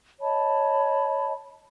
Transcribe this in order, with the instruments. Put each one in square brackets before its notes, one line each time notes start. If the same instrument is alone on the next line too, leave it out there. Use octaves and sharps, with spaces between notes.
[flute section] C#5 D#5 A5 B5